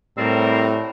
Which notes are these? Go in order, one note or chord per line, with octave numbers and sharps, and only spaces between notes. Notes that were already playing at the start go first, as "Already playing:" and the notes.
A2 G3 C4 A#4